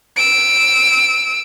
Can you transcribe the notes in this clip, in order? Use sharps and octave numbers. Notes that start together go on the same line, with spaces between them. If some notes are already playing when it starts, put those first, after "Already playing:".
E6 D7